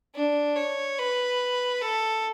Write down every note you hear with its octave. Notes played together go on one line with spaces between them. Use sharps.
D4
C#5
B4
A4